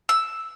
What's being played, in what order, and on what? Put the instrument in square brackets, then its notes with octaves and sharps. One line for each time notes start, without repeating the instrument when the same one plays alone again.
[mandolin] E6